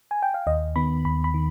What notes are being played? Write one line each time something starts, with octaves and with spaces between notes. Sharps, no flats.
G#5
G5
F5
D#2 D#5
D#3 B3 B5
D#2 B5
B5
D#3